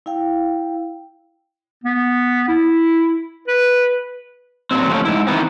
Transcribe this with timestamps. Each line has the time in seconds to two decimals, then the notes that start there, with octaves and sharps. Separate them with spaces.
0.06 E4 F5 G5
1.84 B3
2.48 E4
3.48 B4
4.71 A#2 F#3 C4
4.89 F3 F#3 A3 C#4
5.05 G#2 E4
5.27 D#3 E3 B3 C4